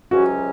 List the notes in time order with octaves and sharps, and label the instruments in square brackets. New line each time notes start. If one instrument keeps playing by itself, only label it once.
[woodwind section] C#2 C3 F#3 C#4 [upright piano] F#4